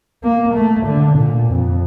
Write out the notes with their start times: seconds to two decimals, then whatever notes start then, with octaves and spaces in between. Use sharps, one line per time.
0.24 A#3
0.55 A3
0.86 D3
1.18 A#2
1.49 F2